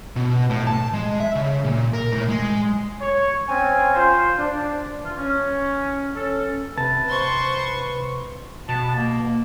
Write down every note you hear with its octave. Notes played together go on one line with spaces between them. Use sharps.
B2
A2
A5
G#3
E5
C#3
A#2
A#4
A2
G#3
C#5
C4 C#4 G#5
F4 C5
D4
E3 F4
C#4
C#4 A4
C3 B4 A5 A6
C5 C6 C#6
B2 A5
A#3